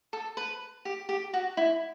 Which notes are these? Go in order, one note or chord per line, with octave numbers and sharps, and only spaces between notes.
A4
B4
G4
G4
F#4
E4